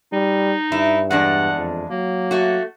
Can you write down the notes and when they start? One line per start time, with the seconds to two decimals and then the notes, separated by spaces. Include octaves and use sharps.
0.13 G3 D#4
0.72 G2 E4
1.11 E2 G#3 D4 F#5
1.57 F2
1.90 F#3 A#3
2.31 A3 F#4